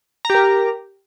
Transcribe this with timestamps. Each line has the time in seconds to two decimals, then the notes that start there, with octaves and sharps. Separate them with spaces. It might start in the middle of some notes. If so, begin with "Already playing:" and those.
0.25 A#5
0.30 G4
0.35 A#4